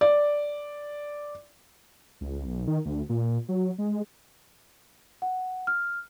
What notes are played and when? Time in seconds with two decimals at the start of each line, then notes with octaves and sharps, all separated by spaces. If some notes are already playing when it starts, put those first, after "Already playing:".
0.01 D5
2.21 C#2
2.46 B1
2.68 D#3
2.85 D2
3.09 A#2
3.49 F#3
3.78 G#3
5.22 F#5
5.67 F6